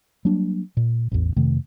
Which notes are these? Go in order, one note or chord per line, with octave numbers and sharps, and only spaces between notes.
F#3 G3 A#3 D4
A#2
A1 E2
F2 C3 D#3 A3